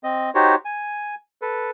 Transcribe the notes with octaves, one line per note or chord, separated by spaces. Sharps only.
C4 D#5
D#4 F#4 G4 C5 C#5
G#5
A4 B4